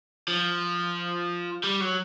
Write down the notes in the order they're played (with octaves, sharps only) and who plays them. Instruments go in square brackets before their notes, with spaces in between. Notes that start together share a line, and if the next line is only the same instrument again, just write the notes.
[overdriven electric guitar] F3
G3
F#3